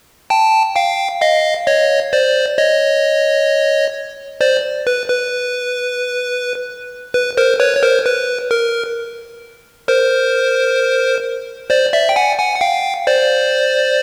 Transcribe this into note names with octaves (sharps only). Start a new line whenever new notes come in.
G5 A5
F5 G5
D#5 F5
C#5 D#5
C5 D5
C#5 D#5
C5 D5
B4
B4
B4
A#4 C5
B4 C#5
C#5
A#4 C5
B4
A#4
A#4 C5
C5 D5
D5 E5
G5
F#5 G#5
F#5 G#5
F#5
F5 G5
C5 D5